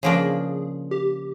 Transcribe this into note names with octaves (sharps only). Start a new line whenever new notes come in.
C#3 F3 A#3 D4 G#4
G4